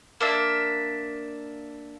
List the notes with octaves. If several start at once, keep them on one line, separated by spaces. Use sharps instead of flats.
A#3 D4 E5